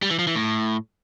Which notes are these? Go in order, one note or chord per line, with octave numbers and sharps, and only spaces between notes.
G3
E3
F3
E3
A2